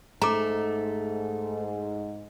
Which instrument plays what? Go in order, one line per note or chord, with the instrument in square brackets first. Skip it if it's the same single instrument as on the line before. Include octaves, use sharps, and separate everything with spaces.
[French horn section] G#2 [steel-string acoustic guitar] A3 [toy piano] A#5 D6